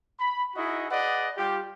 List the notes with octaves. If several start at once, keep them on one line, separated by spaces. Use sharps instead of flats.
B5
D#4 E4 F#4 G#4 D#5
G#4 B4 D5 D#5 F#5
G3 F4 G4